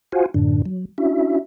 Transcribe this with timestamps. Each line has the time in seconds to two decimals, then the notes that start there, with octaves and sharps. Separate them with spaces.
0.12 F4 F#4 C5 F5 F#5 G#5
0.34 F#2 A2 D3 D4
0.66 F#3
0.98 C#4 D4 E4 F#4 E5